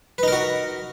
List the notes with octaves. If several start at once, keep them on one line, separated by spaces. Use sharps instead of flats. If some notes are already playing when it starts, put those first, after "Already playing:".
D#4 F#4 A#4 B4